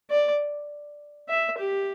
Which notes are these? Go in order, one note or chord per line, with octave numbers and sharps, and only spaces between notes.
D5
E5
G4